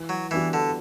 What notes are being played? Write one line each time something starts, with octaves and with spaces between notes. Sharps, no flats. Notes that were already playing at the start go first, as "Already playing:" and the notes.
Already playing: E3
F#3
E3 G3 B3 D4 F#4
D3